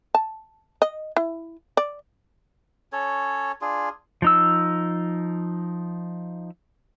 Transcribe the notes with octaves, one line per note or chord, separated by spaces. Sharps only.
A5
D#5
E4
D5
C#4 A4 C#5
D4 F4 G#4
F3 D#4 E6